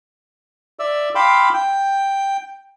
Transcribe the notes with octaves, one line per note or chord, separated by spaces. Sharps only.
D5 E5 E6
F5 G5 B5 C6 D6 E6
G5